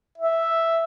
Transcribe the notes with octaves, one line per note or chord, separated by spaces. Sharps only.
E5